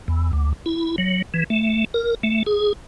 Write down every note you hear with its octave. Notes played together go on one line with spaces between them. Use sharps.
E2
D2
E4
F#3
E3
A3
A#4
A3
G#4